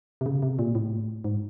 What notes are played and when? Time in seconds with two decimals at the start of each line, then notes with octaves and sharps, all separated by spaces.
0.21 C3
0.26 C#3
0.42 C3
0.59 A#2
0.75 A2
1.24 G#2